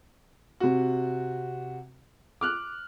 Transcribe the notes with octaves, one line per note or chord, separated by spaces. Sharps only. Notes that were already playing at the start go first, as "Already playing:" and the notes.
C3 F#4
D6 F6 F#6